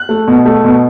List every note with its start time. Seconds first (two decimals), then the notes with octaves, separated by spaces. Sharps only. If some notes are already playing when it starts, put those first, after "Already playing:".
Already playing: F#6
0.09 A3
0.27 B2
0.45 A3
0.64 B2